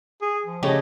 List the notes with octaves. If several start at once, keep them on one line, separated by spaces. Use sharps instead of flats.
G#4
F3
C#3 A3 G4 C#5 D#5